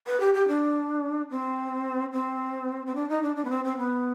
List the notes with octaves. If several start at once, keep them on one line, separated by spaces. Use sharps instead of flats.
B4
G4
G4
D4
C4
C4
C4
D4
D#4
D4
D4
B3
C4
C4
B3